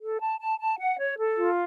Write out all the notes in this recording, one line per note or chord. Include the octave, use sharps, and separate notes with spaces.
A4
A5
A5
A5
F#5
C#5
A4
F4